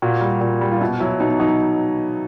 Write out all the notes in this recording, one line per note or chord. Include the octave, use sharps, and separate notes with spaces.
A#2 F#4
G3
A#2
G3
F4
B2 E4
F#3 E4
B2 D#4
F#3 D#4